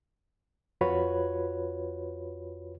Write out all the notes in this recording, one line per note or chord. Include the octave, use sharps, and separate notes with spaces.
F2 F4 F#4 B4 C#5 B5